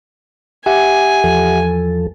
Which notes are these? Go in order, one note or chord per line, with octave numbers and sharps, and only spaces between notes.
G4 E5 F#5 G#5
E2 F3 A4